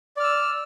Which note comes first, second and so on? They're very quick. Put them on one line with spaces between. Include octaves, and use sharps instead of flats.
D5 F6 E6